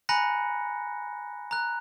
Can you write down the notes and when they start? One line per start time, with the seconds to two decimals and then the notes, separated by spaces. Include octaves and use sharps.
0.09 G#5 A#5 B5 F#6 A#6 C#7
1.51 A#5 F#6